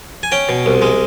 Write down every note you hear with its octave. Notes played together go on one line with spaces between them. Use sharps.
G#5
C#4 G5
B2
C2
G#3